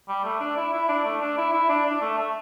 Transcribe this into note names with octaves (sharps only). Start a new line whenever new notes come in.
G3
A3
D4
E4
E4
D4
A3
D4
E4
E4
D4
D4
A3
A3